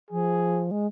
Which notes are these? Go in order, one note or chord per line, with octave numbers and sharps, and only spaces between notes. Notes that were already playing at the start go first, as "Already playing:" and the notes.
F3 G#4
G#3